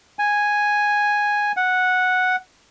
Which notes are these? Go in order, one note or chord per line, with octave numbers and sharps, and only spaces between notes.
G#5
F#5